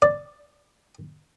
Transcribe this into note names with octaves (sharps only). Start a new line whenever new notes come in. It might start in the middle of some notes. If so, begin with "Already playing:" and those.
D5